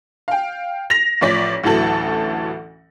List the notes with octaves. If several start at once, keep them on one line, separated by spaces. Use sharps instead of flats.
F5 G5
A#6 F7
A1 F3 C#5 D5 B6
A1 D2 E3 F#3 A4 F#7